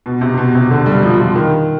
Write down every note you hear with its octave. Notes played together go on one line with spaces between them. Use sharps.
B2
C3
B2
C3
D3
G3
F3
F3
D#3